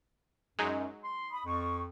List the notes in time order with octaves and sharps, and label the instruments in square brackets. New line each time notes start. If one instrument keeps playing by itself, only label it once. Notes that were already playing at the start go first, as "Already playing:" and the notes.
[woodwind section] F#2 [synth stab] F#3 G#3 D#4
[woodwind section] C6
[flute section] B5 D#6
[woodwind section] F2 [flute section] C#6